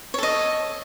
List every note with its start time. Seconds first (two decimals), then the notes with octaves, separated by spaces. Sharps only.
0.14 C#5
0.18 A4
0.23 D#5